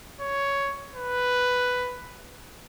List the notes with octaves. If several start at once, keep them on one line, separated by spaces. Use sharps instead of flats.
C#5
B4